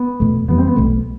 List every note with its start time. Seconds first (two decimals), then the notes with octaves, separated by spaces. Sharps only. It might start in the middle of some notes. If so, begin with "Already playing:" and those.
Already playing: B3
0.20 E2 B2 A3
0.48 F2 E3 G3 B3
0.58 C4
0.67 B3
0.76 B1 B2 A3